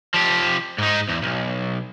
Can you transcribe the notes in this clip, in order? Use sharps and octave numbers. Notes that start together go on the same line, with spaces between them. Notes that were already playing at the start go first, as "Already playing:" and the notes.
F3 G4
G#2 D#4
E2
B1